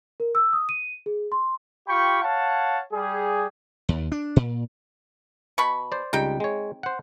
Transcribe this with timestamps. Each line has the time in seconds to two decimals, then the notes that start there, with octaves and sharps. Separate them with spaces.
0.20 A#4
0.35 E6
0.53 D#6
0.69 D#7
1.06 G#4
1.32 C6
1.88 F4 G4 G5 B5 C#6
2.23 C#5 F5 F#5 A5
2.93 G3 G#4
3.89 D#2
4.12 D4
4.36 A#2
5.58 B2 B5 C#6
5.92 C5 D5
6.13 C#2 G3 C4 D#4 G5
6.40 G#3 C#5
6.83 C5 F#5